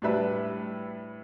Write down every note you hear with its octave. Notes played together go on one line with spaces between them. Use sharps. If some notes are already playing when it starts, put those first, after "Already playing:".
A2 G3 D4 B4 E5